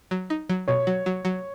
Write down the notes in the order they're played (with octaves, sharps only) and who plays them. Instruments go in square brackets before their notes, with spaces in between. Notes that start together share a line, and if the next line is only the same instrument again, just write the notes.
[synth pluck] F#3
D#4
F#3
[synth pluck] B2 [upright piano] C#5
[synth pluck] F#3
F#3
F#3